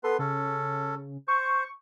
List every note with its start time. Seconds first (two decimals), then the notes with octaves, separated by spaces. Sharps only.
0.04 B3 A4 B4 C6
0.19 C#3 C#4 A4
1.28 C5 C#6